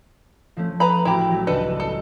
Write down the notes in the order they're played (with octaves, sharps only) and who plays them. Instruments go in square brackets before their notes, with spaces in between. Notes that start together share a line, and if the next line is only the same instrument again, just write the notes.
[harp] F3 A3 C#4
[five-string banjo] B4 A#5 B5
[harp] A1 F#4 [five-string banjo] E4 G4
[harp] F#3 A3
[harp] C#2 D#7 [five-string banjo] D4 A4 B4
[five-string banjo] A4